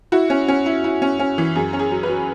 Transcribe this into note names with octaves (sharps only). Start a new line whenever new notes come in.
E4 F#4
C#4
C#4
E4
E4
C#4
C#4
E3
F#2 G#4
C#4
G#4
F#3
B4
F#3